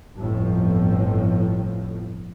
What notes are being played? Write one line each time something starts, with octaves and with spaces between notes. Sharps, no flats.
G1 F2 A2 F3